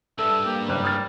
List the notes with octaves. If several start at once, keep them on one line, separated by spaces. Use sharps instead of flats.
C#2 G2 A4 E5
A#3 G4
F#1 G3 F#6
D#6 F6 A6